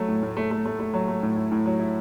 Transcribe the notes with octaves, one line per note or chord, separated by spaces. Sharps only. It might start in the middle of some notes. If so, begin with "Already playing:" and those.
Already playing: F#3 A3
A2
A2
A3
A3
A3
A3
F#3
A3
A2
E4
A2
F#3
E4